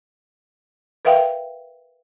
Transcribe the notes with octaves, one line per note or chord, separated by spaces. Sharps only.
A#4 B4 E5 F5 G5